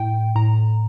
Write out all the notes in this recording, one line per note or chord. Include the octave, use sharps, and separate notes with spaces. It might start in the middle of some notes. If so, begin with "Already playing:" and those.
Already playing: A2 G5
A2 A#5